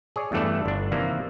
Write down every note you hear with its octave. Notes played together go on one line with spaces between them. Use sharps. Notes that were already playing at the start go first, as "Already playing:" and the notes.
G#4 C#5 D5
E2 G2 E3 A3 A4 D5
G1 D4
C3 D#3 E3 A#3